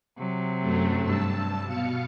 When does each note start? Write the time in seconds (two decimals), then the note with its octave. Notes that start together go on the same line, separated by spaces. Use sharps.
0.18 C3 F#3
0.61 F#2 A3
1.01 G2 A5 E6
1.66 B2 F5 C#7